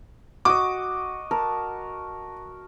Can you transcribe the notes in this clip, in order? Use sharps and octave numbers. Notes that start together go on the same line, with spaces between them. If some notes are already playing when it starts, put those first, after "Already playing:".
F#4 D#5 D6
A#4 A5